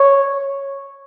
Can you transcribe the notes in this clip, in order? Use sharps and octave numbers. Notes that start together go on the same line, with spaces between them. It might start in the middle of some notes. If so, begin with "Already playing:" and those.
Already playing: C#5